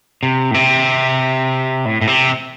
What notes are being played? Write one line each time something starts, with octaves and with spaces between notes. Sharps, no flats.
C3
A2
C3
A2
A2
C3